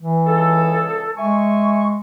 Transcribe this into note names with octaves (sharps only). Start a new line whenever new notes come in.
E3
C#2 G#4 A4
G#3 E5 G#5 C#6